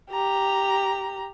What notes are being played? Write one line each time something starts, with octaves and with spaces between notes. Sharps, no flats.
G4 A#5